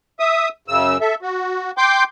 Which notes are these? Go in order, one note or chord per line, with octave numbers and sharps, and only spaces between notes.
E5 D#6
F#2 C#3 E6
A4 E5
F#4
G5 C6 D6 G6